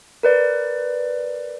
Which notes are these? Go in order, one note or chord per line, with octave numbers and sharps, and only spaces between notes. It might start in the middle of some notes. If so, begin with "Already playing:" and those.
A#4 B4 D5